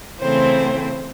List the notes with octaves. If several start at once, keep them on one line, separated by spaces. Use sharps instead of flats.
C#3 E3 A3 C4 C5